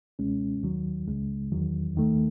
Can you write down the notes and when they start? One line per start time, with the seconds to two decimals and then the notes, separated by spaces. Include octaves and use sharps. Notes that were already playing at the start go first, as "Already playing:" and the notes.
0.19 C#2 B2 G#3 C#4
0.63 D#2 D#3 F#3
1.08 C#2 C#3 G#3
1.52 E2 D#3 F#3
1.96 D#2 D#3 A3